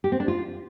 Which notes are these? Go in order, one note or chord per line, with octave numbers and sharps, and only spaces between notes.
G4
C4
D4
F4